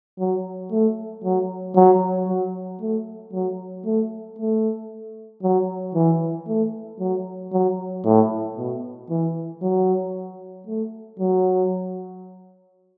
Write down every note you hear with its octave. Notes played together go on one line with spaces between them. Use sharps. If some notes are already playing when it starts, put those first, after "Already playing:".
F#3
A3
F#3
F#3
F#3
A3
F#3
A3
A3
F#3
E3
A3
F#3
F#3
A2
B2
E3
F#3
A3
F#3